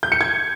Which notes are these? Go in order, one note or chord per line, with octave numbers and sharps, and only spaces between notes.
G6
C#7
G#6